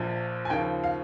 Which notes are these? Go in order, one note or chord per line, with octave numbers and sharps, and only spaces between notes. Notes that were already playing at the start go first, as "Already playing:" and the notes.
Already playing: A#1 A#2 F3
G#5
D#2 C#3 F3 G5
F5